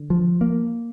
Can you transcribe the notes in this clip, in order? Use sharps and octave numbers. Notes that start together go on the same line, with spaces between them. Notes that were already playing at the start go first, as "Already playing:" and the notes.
Already playing: D3
F3
A#3